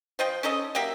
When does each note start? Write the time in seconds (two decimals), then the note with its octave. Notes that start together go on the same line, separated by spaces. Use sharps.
0.19 F3 C5 D#5 G5
0.43 C#4 D#4 A4 D#5
0.75 F#3 A#3 G4 E5